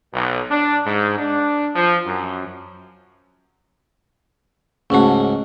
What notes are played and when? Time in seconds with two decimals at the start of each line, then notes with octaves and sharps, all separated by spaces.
0.14 B1
0.51 D4
0.86 G#2
1.19 D4
1.75 F3
2.07 F#2
4.90 C#2 G#2 A3 C#4 F#4